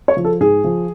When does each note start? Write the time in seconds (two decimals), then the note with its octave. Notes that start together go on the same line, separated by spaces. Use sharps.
0.08 C#5
0.17 F3
0.25 A4
0.40 G#2 G#4
0.64 F3